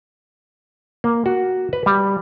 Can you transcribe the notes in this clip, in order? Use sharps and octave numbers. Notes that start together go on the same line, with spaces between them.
A#3
F#4
B4
G3